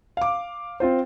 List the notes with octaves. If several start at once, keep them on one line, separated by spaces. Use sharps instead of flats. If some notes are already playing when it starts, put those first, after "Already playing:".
F5 D6
C4 F4 C5